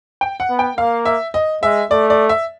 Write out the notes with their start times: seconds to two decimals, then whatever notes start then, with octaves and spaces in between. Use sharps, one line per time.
0.21 G5
0.40 F#5
0.50 B3
0.59 G5
0.77 A#3 F5
1.05 E5
1.34 D#5
1.63 G#3 E5
1.91 A3 D5
2.10 D5
2.29 E5